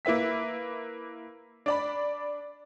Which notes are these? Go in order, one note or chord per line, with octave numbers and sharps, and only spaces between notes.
A#3 E4 B4 E5 B6
D4 D5 B5